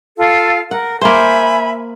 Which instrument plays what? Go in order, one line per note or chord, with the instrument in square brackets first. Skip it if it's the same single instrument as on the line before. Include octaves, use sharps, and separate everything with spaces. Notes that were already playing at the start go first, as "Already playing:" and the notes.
[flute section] F4 A4 F5
[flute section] A#4 [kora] F#5
[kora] A#3 C5 [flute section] E5 G#5 B5